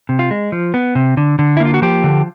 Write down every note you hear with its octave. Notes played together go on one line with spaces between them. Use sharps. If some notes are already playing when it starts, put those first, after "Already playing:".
C3
F4
G#3
F3
B3
C3
D3
D3
E4
A#3 F4
F#4
F3 G4
D3